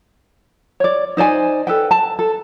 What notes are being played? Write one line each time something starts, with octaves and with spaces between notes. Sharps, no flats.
C#5 D5
D#4 C5 D5 G#5
A4 B4 G5
A5
A4